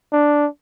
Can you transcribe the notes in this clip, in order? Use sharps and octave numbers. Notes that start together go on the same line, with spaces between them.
D4